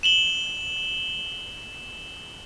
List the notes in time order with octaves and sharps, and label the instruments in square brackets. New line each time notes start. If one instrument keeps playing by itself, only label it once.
[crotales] E7 F#7 G7